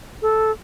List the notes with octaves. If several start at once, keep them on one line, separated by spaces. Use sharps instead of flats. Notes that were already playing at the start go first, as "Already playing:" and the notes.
A4